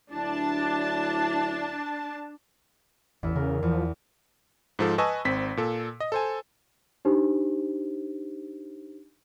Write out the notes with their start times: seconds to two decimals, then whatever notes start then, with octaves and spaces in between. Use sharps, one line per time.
0.12 D2 F#3 D4 E4 A5
3.23 A1 E2 E4
3.35 C#3 A#4
3.63 E2 F3
4.79 G#2 F3 A4
4.98 B4 D#5 G#5 A5 C#6 E6
5.25 G#1 C4 B6
5.57 A#2 A4
6.00 D#5
6.12 A4 C5 G#5
7.05 D4 D#4 G4 C5